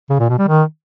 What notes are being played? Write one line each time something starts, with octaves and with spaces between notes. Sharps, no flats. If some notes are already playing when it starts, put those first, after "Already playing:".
C#3
A#2
B2
G3
D#3